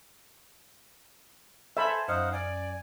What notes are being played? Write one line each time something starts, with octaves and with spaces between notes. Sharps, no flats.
A4 C5 E5 G#5 A5 B5
F#2 D#4 C5 F5 F#5
D5 G#5